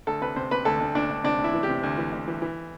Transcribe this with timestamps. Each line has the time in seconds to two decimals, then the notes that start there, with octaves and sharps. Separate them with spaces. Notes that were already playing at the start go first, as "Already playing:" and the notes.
0.07 D2 A4
0.21 C3 B4
0.36 C3 C5
0.51 C3 B4
0.65 D2 A4
0.80 D2
0.95 D2 D4
1.10 D2
1.24 C3 D4
1.39 D2
1.44 E4
1.54 E3
1.63 G4
1.69 C3
1.83 D2
1.98 E3
2.12 D2
2.28 E3
2.42 E3